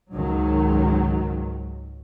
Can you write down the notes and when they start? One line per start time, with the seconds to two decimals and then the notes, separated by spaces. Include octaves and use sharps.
0.14 C#2 G#2 D#3 F#3